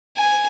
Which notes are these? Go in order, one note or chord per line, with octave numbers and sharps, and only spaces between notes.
G#5